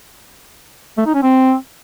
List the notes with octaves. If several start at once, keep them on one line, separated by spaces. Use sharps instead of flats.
A3
D#4
C#4
C4